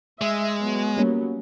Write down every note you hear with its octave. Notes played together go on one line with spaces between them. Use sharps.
G#3 E5
F#3 B3
G3 A#3 C#4